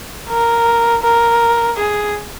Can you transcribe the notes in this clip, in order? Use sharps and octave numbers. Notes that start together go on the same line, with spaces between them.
A#4
A#4
G#4